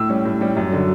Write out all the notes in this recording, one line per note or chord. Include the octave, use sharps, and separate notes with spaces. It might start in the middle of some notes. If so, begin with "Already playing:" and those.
Already playing: A2 E6
G3 C#4
A2
G3 C#4
F#2
D3 F#3